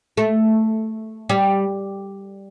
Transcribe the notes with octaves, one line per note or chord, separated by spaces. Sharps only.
A3
G3